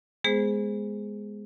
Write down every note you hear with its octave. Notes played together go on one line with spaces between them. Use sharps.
G#3 B3 G#4 C5